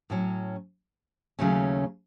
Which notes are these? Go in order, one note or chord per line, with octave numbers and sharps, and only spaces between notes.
A2 F#3 C#4
D#2 C#3 F#3 A3 C#4